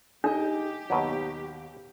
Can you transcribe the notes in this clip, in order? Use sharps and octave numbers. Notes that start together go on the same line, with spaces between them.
D4 D#4 G4 D#5
D#2 B2 F#3